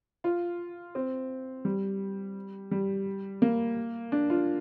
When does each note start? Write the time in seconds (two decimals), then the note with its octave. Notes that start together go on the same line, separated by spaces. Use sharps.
0.24 F4
0.95 C4
1.65 G3
2.71 G3
3.42 A#3
4.12 D4
4.30 F4